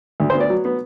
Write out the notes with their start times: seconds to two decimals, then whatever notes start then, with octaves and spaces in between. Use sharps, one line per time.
0.20 D2
0.30 C5
0.35 B3
0.40 D5
0.50 F#3
0.65 B3